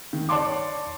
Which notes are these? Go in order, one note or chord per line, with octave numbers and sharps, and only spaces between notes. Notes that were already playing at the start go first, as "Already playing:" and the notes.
D#3
C#5 D5 A5 C6 D6